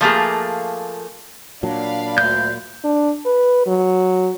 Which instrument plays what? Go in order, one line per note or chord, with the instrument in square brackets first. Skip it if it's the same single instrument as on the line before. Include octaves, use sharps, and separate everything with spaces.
[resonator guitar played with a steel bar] F3 A3 A#3 G#4
[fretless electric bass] A#2 F#3 [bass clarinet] D4 [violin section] D5 F5 B5
[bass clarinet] D2 [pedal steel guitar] G6
[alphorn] D4
B4
F#3